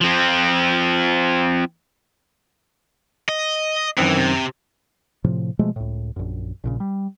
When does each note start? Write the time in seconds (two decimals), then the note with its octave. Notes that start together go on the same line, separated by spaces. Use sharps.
0.01 F3 C4
3.29 D#5
3.98 F#2 D#3 E3 C4
4.16 C3
5.24 A2 C3 F3
5.59 B2 F3 G#3 A3
5.76 C#2 A2
6.16 A#1 F#2
6.64 A#1 A#2 C#3
6.80 G3